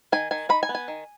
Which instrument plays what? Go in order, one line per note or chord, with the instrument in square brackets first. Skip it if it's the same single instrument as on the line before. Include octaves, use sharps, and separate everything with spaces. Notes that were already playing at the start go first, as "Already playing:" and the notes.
[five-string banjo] D#3 G#5
D#3 G#5
D#4 B5
G#5
B3
G#5
D#3